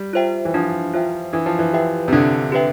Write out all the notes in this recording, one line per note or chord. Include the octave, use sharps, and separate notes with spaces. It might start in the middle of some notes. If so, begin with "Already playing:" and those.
Already playing: G3
F4 C5 E5 G5
E3
F3 D4
F4 C5 E5 G5
E3 D4
F3
E3
G4 B4 E5 G5
C3
D3 D4
G4 B4 E5 G5